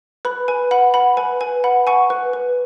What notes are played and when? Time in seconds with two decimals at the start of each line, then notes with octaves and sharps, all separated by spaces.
0.25 B4 B5
0.48 B4 G#5
0.71 F#5 B5
0.94 F#5 B5
1.17 B4 G#5
1.41 B4 G#5
1.64 F#5 B5
1.87 F#5 G#5 C#6
2.10 B4
2.33 B4